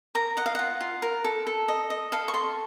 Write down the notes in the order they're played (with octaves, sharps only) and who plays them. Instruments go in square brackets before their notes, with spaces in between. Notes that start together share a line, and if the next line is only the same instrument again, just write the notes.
[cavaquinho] A#4 A#5
D#5 F#5
F5
F4 F#5
F4
A#4
A4
A4
D#5
D#5
A4 F5
C#6
A4 C6